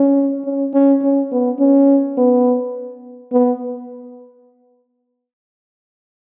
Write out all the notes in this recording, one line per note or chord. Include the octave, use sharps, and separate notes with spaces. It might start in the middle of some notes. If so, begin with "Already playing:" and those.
Already playing: C#4
C#4
C#4
C#4
B3
C#4
B3
B3